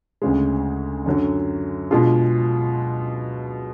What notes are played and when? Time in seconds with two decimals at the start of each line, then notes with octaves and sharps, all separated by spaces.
0.22 D2 C#3 G#3
1.06 F#2 D3 F#3
1.91 B2 G#3 D4 F4 G#4